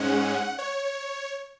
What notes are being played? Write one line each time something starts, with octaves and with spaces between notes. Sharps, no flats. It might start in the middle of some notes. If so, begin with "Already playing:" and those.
Already playing: G#2 G#3 C#4 F#5
C#5